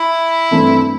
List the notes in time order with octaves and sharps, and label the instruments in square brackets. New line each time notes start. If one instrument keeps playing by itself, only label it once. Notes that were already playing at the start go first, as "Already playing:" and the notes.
Already playing: [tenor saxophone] E4
[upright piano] G2 E3 A3 C4